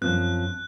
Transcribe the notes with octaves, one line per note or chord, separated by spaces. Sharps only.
F#2 F3 C4 F#6